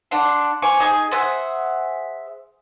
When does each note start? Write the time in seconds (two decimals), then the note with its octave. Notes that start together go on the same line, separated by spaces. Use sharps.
0.11 D4 F#5 C6
0.62 C5 G#5 C#6 D6
0.80 D#4 G#4 G#5
1.11 G#4 C5 E5 F#5